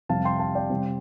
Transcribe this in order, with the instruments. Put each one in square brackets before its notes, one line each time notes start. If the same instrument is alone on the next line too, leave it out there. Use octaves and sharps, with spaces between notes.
[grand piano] F2 C3 G3 F5 A5
G5 C6
F5 A5
D5 G5
C3 G3 C4